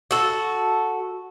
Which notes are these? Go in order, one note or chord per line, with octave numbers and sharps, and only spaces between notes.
F#4 A4